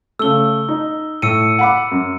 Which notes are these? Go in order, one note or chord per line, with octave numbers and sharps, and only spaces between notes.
C#3 A3 E6 G7
D#4
A2 E6 C#7 D#7
F#5 B5 D6
F#2